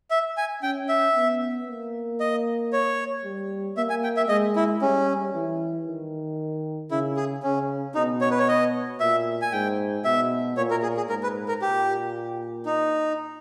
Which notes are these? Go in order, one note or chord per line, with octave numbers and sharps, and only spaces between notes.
E5
G#5
C#4 G5
E5
B3
A#3
D#5
C#5
G3
A#3 E5
G#5
G5
E5
G#3 D#5
E4
G3 C#4
E3
D#3
C#3 E4
G#4
C#3 C#4
B2 D#4
C#5
B4
C#5
D#5
A#2 E5
G#5
G#2 G5
B2 E5
A#2 C#5
A#4
G#4
G#4
G#2 A#4
B4
A#4
A#2 G4
D#4